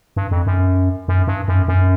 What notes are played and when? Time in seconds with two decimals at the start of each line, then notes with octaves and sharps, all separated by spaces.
0.16 G2
0.31 F2
0.47 F#2
1.08 F#2
1.27 G2
1.48 F#2
1.68 F#2